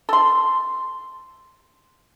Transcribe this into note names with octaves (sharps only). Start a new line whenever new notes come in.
A4 C6